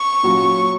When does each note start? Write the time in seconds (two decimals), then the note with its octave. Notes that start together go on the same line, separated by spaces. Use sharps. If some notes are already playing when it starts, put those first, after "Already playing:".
Already playing: C#6
0.23 A#2 F#3 C#4 F4